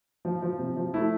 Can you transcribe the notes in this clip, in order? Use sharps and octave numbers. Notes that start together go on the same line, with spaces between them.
F3
F3
C3
F3
A3 E4